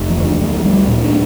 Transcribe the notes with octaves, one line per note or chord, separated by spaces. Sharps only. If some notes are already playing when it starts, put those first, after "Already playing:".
Already playing: F1
F3
D2
D3
D2 F3
D2 G3
A#2
D4